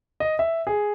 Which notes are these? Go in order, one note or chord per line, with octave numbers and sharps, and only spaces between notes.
D#5
E5
G#4